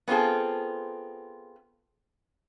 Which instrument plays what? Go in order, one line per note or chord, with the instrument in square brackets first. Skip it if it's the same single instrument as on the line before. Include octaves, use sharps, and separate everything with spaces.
[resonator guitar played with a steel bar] B3 C4 F4 G#4 A4